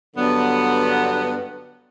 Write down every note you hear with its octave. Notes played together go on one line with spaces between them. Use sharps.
G2 D3 F#3 B3